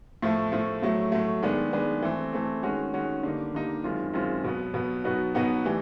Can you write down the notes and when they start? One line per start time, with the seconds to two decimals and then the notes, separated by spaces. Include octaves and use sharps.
0.22 A2 F3 A3
0.52 A2 F3 A3
0.82 A2 F#3 A3
1.12 A2 F#3 A3
1.43 D#3 G#3 B3 D4
1.72 D#3 G#3 B3 D4
2.02 E3 A3 C4
2.33 E3 A3 C4
2.63 D#3 G#3 C#4 F#4
2.94 D#3 G#3 C#4 F#4
3.23 D3 G3 A#3 D#4
3.54 D3 G3 A#3 D#4
3.84 F#2 D#3 G#3 C4 F4
4.14 F#2 D#3 G#3 C4 F4
4.44 B2 F#3 B3
4.74 B2 F#3 B3
5.04 B2 F#3 B3 D#4 F#4
5.34 B2 F#3 B3 D#4 F#4
5.65 A2 E3 G3